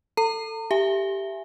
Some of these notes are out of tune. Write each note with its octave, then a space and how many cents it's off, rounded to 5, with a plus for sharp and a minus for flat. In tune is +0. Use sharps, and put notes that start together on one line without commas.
A4 +15 A#5 -45
G4 +0 E5 +15 G#5 +0